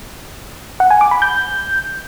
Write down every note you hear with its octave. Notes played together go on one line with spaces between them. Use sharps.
F#5
G#5
D6
B5
G6